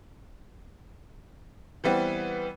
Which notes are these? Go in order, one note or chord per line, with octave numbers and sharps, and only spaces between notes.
E3 G3 B3 C4